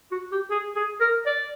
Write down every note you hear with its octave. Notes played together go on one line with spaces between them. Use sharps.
F#4
G4
G#4
G#4
A#4
D5